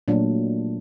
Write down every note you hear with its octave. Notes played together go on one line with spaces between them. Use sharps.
A#2 F#3 A3 D4